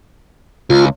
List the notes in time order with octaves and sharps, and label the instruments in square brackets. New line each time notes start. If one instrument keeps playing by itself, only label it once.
[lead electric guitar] C#2 [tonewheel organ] F4